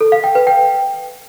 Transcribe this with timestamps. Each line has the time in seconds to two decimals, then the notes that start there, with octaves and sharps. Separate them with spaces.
0.01 A4
0.12 F5
0.24 G5
0.35 B4
0.47 G5